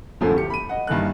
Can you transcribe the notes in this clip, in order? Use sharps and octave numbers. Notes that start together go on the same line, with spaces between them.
C2 F#2 A2 D3 F3
D1 G4 C#7
B5 D#7
D#5 F#5
G2 D#3 E3 A#3 F#6